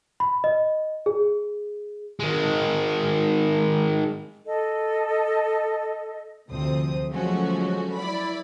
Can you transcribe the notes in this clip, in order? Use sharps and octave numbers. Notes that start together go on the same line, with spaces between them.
B5
D#5
G#4
D#3 G#3
A4 D#5
D2 C3 F3 C4 C5 D#6
F3 F#3 G#3 A3 C#4 F#4
E4 D5 B5